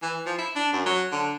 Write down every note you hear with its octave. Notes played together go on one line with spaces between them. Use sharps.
E3
F3
E4
D4
F#2
F#3
D3